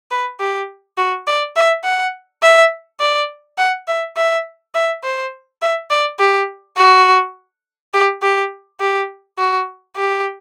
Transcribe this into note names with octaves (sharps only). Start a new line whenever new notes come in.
B4
G4
F#4
D5
E5
F#5
E5
D5
F#5
E5
E5
E5
C5
E5
D5
G4
F#4
G4
G4
G4
F#4
G4